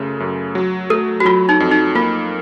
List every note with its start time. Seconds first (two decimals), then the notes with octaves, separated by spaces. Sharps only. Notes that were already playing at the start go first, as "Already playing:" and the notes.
Already playing: F#2 C#3 A3
0.20 F#2
0.55 F#3
0.90 A3 A4
1.20 F#4
1.25 F#3 F4
1.49 D#4
1.60 F2
1.71 D#4
1.95 A#3 F4